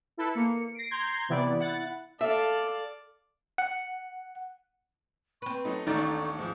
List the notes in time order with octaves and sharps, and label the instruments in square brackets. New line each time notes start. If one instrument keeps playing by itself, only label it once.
[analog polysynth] E4 A4 B4
A#3 C#7
A#6 C7 D7
A#5 C6 G6 G#6
C3 E3 B3 E4 D5
E4 F#5 A6
[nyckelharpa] A4 F5 [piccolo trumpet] D5 [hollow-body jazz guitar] E5
[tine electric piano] F#5
[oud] C4 B4 [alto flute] C#6
[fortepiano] F#3 A3 D#4
[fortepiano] A1 D#2 D5 [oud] A3 D4 [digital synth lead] D#4
[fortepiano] G#2 F3 [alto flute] F5